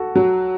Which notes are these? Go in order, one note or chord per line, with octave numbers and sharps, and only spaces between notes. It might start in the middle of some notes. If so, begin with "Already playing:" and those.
Already playing: F#4 A4
F#3